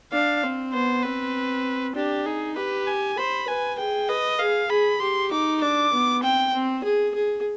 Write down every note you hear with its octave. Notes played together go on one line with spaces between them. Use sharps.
D4 F5
C4
B3 C5
C4 B4
D4 G4
D#4 G#4
G4 B4
G#5
C5 B5
B4 G#5
G#4 G5
B4 D#5
G#4 F5
G#4 B5
G4 C6
D#4 D6
D4 D6
B3
C4 G5
C4
G#4
G#4